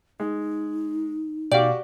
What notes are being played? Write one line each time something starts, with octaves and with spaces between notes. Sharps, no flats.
G#3 D#4
B2 F#4 G4 D5 F5 G5